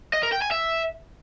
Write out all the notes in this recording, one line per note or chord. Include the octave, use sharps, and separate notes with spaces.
D#5
A#4
G5
G#5
E5